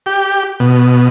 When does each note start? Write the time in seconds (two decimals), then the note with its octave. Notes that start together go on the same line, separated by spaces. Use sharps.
0.06 G4
0.60 B2